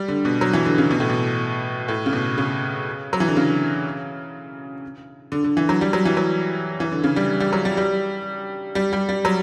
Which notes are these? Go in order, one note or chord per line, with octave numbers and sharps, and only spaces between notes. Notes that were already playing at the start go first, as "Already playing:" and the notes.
Already playing: G3
D3
B2
F#3
E3
D3
C#3
B2
A2
B2
A2
C#3
B2
C#3
F#3
E3
D3
C#3
D3
D3
E3
F#3
G3
F#3
E3
F#3
E3
D3
C#3
G3
G3
F#3
G3
G3
G3
G3
G3
F#3